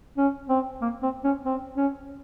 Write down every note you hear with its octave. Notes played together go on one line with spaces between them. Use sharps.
C#4
C4
A#3
C4
C#4
C4
C#4